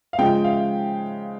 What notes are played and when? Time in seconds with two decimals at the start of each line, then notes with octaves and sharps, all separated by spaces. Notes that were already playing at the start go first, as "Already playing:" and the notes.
0.13 F5
0.18 C#3 F3 G#3 G5
0.44 F5